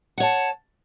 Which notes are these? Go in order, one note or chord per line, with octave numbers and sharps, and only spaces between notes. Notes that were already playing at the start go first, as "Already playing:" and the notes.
C#5 F#5 A5